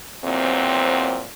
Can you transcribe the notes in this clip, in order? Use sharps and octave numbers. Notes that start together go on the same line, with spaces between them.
E2 A#2 F#3 C4